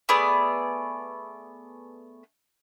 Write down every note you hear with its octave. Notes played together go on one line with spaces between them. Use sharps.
A3 B3 G#4 D5